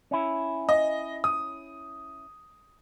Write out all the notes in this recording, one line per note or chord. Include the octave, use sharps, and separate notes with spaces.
C#4 E4
D#5
D#6